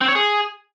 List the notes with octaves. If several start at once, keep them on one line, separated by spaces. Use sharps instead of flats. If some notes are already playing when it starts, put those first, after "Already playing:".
C4
C#5
G#4